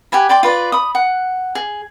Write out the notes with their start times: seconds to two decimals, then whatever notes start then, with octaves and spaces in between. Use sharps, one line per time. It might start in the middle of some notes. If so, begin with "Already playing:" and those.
0.12 G4 F#5 G#5 B5
0.29 D5 G5 C6 D6
0.43 F4 B4 D5
0.72 B5 D#6
0.95 F#5
1.55 G#4